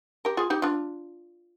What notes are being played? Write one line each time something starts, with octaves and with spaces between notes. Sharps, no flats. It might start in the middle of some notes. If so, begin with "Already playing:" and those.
G4 A#4
F4 G#4
D#4 G4
D4 F4